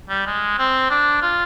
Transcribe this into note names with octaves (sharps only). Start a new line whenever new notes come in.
G3
G#3
C4
D4
F4